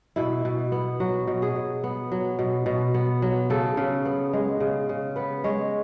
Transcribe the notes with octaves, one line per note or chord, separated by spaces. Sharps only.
B2 E4
B2
B3
F#3 F#4
B2
G#4
B2
B3
F#3
B2
B2
B3
F#3
C#3 A4
C#3
B3
G#3
C#3
C#3
B3 B4
G#3 C#5